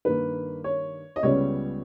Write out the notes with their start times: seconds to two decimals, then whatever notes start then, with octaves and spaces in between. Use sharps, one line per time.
0.05 G2 D#3 A#3 B4
0.64 C#5
1.16 D#5
1.23 C#2 C#3 G3 B3 C#5